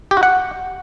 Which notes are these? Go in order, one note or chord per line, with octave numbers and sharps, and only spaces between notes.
G4
F#4
F#5